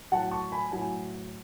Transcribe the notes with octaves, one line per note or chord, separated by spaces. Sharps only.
A2 F#3 F#5 A5
A5 C#6
G#5 B5
A2 F#3 G#5